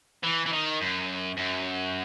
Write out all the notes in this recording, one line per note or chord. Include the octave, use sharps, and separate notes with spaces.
E3
E3
D#3
F#2
F#2